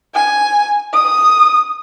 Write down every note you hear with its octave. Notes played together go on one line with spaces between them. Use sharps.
G#5
D#6